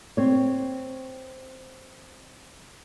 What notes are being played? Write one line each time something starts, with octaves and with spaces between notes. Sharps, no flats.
C4 C#5